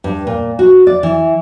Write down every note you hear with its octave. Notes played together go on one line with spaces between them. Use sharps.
G2
A#2
F#4
D5
E3